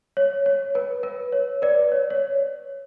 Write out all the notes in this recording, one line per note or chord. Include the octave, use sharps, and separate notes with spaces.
C#5
C#5
B4
B4
C#5
B4 D5
C#5
C#5